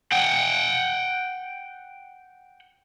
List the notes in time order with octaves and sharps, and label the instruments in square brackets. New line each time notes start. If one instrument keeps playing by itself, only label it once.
[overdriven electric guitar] F#5 G5